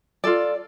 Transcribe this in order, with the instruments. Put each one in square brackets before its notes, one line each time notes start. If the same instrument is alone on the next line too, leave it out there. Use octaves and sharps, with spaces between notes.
[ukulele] F4 A4 D5